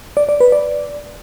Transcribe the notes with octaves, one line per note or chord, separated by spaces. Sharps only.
D5
D5
B4
D5